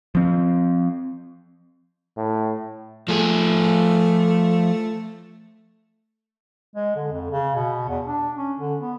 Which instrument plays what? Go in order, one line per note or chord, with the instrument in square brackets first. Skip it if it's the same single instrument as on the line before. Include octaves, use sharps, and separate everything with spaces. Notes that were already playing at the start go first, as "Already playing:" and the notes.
[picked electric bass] F3 C4
[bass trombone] A2
[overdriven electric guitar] F3 G#4 [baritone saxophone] A3
[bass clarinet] G#3
D3
F2
C#3
B2
E2
D4
C#4
D3
B3